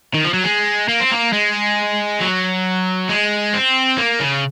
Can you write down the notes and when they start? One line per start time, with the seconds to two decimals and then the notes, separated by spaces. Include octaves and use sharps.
0.15 D#3
0.25 F3
0.34 F#3
0.44 G#3
0.88 A#3
1.00 C4
1.11 A#3
1.33 G#3
2.21 F#3
3.09 G#3
3.53 C4
3.98 A#3
4.20 C#3